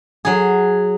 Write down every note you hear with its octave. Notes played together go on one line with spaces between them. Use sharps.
F#3 G#4